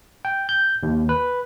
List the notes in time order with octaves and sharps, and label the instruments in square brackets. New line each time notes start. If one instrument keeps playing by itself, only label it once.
[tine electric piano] G5
G6
D#2
B4